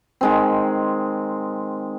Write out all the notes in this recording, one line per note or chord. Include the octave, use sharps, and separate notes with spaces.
D#3 G#3 C4